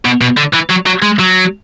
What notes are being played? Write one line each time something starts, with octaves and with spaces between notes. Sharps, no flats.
B2
B2
D3
E3
F#3
F#3
G#3
F#3